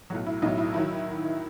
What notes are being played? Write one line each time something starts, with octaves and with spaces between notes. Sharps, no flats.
B1 A2 F#3 F#4
E4
B1 A2 F#3 D#4
E4
D#3 F#3 E4